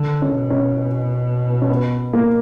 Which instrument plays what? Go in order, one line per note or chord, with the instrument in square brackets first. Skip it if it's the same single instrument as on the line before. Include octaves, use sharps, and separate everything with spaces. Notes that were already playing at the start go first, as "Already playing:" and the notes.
Already playing: [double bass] D3
[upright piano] C#4
[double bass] B2
[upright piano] C#4
C#4
B3
A#3